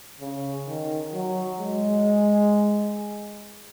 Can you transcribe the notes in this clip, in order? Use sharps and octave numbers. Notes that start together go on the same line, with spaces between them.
C#3
D#3
F#3
G#3